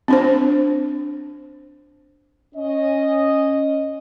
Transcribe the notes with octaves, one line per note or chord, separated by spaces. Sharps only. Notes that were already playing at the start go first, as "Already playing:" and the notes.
C4 D4 C5
C#4 D#5